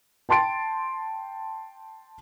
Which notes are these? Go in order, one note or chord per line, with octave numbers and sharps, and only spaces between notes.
G5 A5 C6 A6 D7